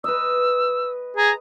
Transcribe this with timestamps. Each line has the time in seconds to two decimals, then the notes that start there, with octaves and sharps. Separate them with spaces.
0.04 B4 D#5 E6
1.17 G#4 A#5